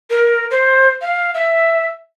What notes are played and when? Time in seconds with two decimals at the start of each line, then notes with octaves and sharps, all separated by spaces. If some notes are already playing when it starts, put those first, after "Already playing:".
0.10 A#4
0.51 C5
1.02 F5
1.34 E5